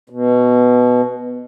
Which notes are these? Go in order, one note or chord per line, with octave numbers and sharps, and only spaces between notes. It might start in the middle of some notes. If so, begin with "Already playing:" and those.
B2